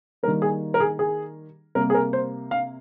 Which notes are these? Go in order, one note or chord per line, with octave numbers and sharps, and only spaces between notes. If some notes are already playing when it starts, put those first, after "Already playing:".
D#3 G3 A#3 A#4
G#4
A#4
G#4
G#4
C3 G3 A#3 A#4
G#4
A#4
C5
F5